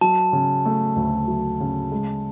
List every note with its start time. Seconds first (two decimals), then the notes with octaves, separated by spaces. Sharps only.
0.01 F#3 A5
0.33 C#3
0.65 A3
0.96 D2
1.28 F#3
1.60 C#3
1.92 G#3